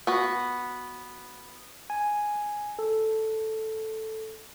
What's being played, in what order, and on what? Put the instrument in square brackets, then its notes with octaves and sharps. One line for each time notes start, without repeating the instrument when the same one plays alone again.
[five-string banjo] B3 F#4
[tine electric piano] G#5
A4